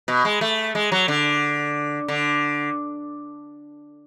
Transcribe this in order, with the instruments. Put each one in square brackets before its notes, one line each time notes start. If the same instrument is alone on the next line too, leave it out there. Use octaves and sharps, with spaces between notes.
[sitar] B2
G#3
A3
G#3
F#3
D3
D3